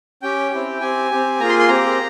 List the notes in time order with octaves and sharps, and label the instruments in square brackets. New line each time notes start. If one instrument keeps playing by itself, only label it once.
[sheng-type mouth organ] C#4 G4 G5
C4 E4 G4
C4 G4 G#5
C4 G4
A#3 F4 G#4 A#5
C6
C6
C4 G4 A#5